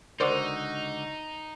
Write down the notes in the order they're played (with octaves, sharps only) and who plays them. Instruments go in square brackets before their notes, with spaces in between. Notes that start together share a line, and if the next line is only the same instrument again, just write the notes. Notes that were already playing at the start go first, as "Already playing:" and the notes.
[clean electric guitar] C#2 D3 F#4 [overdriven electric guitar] D#4 [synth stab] A#4 C5 D5